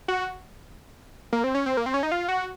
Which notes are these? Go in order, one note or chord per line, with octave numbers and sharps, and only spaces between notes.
F#4
A#3
C4
C#4
C4
A#3
C4
C#4
D#4
F4
F#4